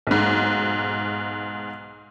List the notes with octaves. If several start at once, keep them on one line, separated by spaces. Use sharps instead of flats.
B1 G#2